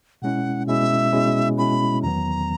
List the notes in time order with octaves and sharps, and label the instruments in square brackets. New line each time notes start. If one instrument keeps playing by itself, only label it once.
[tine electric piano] B2 G#3 C#4 E4 [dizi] F#5
[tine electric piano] B2 G#3 C#4 E4 [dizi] E5
[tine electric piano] B2 G#3 C#4 E4
[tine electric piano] B2 G#3 C#4 E4 [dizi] B5
[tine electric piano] E2 D#3 F#3 B3 [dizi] A#5